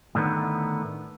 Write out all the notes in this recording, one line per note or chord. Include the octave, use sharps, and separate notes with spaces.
A2 D3 D#3 B3